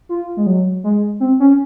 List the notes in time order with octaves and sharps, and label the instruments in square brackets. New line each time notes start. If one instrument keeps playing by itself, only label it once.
[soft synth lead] F4
G#3
F#3
G#3
C4
C#4